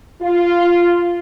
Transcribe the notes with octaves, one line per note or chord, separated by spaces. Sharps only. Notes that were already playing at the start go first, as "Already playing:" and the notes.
F4